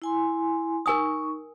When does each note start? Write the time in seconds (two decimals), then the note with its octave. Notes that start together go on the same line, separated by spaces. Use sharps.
0.02 E4 G#5 C6
0.86 D#4 A#4 G#5 C#6 D#6